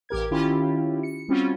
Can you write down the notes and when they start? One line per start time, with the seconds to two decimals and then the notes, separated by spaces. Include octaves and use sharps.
0.09 A1 G4 A#4 G#6
0.31 D#3 C#4 E4 F4 G4
1.03 C#7
1.28 G3 C4 C#4 F4 F#4